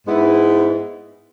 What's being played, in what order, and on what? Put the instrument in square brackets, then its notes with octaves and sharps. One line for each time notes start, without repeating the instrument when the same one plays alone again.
[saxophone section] G#2 G#3 B3 E4